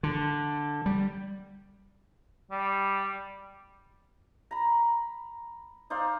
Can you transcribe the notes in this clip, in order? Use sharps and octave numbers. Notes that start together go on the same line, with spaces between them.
D3
G3
G3
A#5 B5
D#4 C5 D5 F5